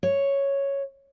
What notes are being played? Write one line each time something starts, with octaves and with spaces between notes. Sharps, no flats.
C#5